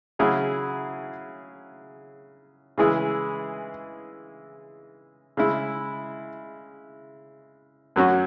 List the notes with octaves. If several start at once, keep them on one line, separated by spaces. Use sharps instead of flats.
C#3 F#3 E4 G#4
C#3 E3 G#3 E4 G#4
C#3 G#3 E4
F#2 F#3 C#4 F#4